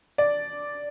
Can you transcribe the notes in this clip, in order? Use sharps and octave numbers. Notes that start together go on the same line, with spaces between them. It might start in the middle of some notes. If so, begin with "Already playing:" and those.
D5